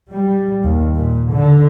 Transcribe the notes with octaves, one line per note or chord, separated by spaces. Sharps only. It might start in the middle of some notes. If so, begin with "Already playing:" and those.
G3
D#2
A#2
D3